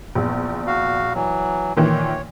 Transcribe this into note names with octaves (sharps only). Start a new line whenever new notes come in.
A#1 E2
F#4 F5
E3 F#3
A#2 D#3 E3 C#5